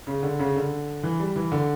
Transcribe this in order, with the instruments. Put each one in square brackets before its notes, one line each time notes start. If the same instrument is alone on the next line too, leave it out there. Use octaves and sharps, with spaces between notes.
[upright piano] C#3
D3
C#3
D3
E3
G3
E3
D3